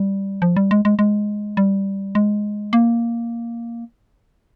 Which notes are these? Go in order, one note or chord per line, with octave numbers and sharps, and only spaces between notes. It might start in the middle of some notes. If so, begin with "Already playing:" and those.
Already playing: G3
F3
G3
G#3
G#3
G#3
G3
G#3
A#3